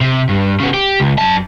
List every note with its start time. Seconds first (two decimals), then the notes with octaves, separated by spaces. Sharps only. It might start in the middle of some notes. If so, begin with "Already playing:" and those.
0.01 C3
0.29 G2
0.60 C#3 B3
0.74 G4
1.00 C#2
1.18 F#2 A5